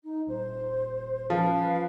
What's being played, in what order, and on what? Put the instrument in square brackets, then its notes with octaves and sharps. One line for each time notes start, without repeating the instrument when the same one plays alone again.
[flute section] D#4
[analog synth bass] D#1 [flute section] C5
[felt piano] F3 [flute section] C#4 B4 F5